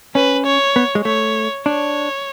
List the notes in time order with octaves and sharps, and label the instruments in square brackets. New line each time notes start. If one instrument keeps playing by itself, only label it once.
[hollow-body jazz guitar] C#4 [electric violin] B4
[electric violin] C#5
[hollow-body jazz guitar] B3
G#3
[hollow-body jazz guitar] A3 [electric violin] C#5
[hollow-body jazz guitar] D4 [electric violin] C#5